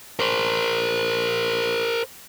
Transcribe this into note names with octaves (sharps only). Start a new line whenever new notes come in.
A#4 C5